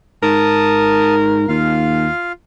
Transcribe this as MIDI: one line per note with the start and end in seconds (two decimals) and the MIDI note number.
0.23 1.44 44
0.23 1.62 70
0.23 1.15 81
0.23 1.15 87
1.48 2.08 39
1.48 2.32 65
1.48 2.32 77